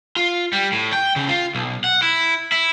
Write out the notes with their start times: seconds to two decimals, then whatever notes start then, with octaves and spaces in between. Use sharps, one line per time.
0.16 F4
0.53 G3
0.72 A2
0.93 G5
1.16 C#3
1.29 F4
1.55 B1
1.84 F#5
2.02 E4
2.52 E4